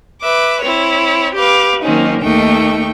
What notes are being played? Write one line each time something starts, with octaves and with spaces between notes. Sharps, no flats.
B4 E5 D6
C4 E4 C#5
G4 B4 F5 D6
D#3 F#3 A#3 C4 C#4 D#4
D#2 A3 A#3 D#4 G5 C#6